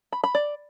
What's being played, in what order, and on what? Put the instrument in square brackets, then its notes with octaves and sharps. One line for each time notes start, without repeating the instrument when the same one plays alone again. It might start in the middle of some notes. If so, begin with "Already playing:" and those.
[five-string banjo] B5
B5
D5